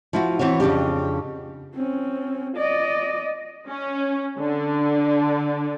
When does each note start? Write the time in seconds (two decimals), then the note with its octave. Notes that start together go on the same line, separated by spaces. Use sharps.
0.13 F3 E4 F#4
0.39 E3 B3 C4 F#4 C#5
0.60 F2 C#3 D4 G4
1.75 C4 C#4
2.57 D5 D#5
3.68 C#4
4.39 D3